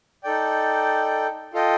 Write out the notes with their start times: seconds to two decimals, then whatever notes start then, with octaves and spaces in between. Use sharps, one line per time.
0.24 D#4 A4 D5 G5
1.53 F4 A4 D#5 G5